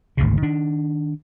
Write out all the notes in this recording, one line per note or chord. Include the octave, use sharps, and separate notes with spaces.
G#1 D2 G#2 C#3
D#3 D4